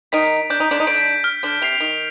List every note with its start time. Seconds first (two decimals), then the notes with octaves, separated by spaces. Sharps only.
0.12 D#3 D#4 B6 D7
0.50 D4 G6
0.60 D#4
0.71 D3 D4
0.80 D#4
0.87 D3 D4 B6 D7
1.24 F6
1.43 D3 D4
1.62 C3 C4 C7 F7
1.80 D#3